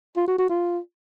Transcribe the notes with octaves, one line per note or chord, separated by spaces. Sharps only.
F4
F#4
F#4
F4